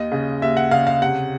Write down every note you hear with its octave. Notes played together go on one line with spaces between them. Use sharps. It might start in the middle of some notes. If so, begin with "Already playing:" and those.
Already playing: D#2 D#5
C#3
D#2 E5
F#5
C#3 F5
F5
C3 F#5